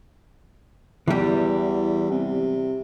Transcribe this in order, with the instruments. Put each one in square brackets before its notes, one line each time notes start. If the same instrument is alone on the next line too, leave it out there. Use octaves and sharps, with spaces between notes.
[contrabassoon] E2 [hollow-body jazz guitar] E3 G3
[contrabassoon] C3